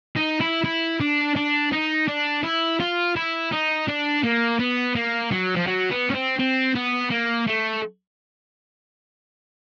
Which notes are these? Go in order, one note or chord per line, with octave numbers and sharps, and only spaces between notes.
D#4
E4
E4
D4
D4
D#4
D4
E4
F4
E4
D#4
D4
A#3
B3
A#3
F#3
F3
F#3
B3
C#4
C4
C4
B3
A#3
A3